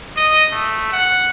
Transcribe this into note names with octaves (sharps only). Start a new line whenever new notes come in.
D#5
A3
F#5